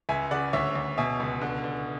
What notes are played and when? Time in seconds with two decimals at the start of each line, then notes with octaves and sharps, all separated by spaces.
0.09 C#2 E5 G#5
0.31 C#3 D5 F#5
0.53 D2 C#5 E5
0.75 D2
0.98 B2 E5 G#5
1.20 C#2
1.41 D3
1.64 D3